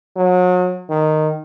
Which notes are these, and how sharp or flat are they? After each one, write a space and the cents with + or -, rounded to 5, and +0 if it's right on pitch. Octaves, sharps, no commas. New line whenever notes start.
F#3 -35
D#3 -10